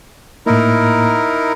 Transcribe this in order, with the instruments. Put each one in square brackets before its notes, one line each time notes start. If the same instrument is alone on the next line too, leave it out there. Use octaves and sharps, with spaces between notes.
[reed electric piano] A2 A#3 [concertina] D#4 E4 A#4